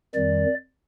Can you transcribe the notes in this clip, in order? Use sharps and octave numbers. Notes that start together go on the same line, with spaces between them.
F2 D#3 G3 D5